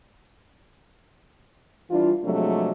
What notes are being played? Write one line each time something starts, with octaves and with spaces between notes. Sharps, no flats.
E3 G3 D4 F4
C3 F3 F#3 G#3 A3 D4